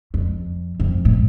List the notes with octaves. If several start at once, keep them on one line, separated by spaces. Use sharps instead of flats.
F2
F2
A2